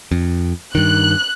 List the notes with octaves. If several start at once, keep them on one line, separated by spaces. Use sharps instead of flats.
F2
G2 D#3 F#6